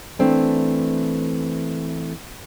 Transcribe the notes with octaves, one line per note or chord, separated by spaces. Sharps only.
E3 A3 C4 D4